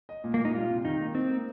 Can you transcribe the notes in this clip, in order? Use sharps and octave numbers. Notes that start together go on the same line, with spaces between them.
D#5
A#2
A#3
A#2 D#4
G3 F4
C3
D#3 D#4
A#3
C4 D#4
A#3